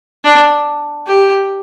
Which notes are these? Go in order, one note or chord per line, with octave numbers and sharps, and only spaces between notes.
D4
G4